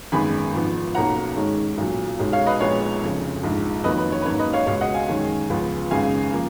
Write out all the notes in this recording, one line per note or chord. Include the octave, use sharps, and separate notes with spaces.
G#1 F#2 D#3 G#3 B3 G#5 B5
G#1 G#2 F3 B3
B1 B2 A#3 C#4 F#5 A#5
G#2 D#3 G#3 C#4
B1 A#2 F#3
B1 B2 G#3 C#4
C#5 F5
B4 D#5
A#1 A#2 G#3 B3 C#5
F1 F2 C#3
A#1 G#2 F3 G#3
F2 D#3 F#3 A#3 C#4 B4 D#5
B4
C#5
B4
G#2 F#3 A#3 C#4 C#5
B4 D#5
C#5 F5
C#2 B2 G#3 C#5 F5
D#5 F#5
F5 G#5
F#2 D#3 G#3 C#4
C#2 C#3 F3 B3
G#1 F#2 C#3 G#3 B3 F5 G#5
F3 A#3